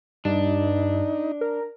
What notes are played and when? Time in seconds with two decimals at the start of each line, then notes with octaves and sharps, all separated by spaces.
0.25 G2 D4 D#4
1.41 A#4